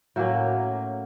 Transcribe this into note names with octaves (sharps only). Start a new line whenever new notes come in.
A2 F#3 A#3 C#4